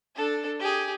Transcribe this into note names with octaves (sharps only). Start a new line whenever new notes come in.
D4 A4
G4 G#4